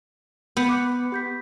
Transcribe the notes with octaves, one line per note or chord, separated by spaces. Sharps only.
B3 G6 C#7
D6 F#6 C#7
G4 G6 B6